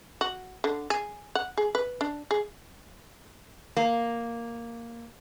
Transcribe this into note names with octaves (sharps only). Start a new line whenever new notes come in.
F#4
D3
G#4
F#5
G#4
B4
D4
G#4
A#3